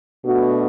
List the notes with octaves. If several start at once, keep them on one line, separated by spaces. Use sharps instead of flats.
B2 A3 D4 F#4